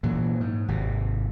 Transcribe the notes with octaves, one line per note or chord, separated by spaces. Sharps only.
A#2 E3 F#3
G#2
G#1 C3